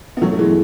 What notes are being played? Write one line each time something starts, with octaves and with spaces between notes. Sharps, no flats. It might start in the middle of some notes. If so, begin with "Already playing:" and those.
B3
F#3 A3
A3
E3 G#3